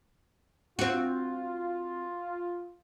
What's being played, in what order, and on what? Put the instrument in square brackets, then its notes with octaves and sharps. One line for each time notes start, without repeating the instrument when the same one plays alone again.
[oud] C4 F#4 [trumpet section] F4